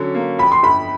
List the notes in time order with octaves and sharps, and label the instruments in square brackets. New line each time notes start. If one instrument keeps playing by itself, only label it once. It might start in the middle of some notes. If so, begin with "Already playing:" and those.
Already playing: [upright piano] D3 F#3 C#4
A#3
[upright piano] F2 [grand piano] B5
[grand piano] C6
[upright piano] G1 [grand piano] B5